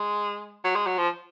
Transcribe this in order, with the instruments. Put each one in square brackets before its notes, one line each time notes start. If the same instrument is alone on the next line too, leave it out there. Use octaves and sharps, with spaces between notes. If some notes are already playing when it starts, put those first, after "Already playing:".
Already playing: [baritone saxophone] G#3
F#3
G#3
F#3
F3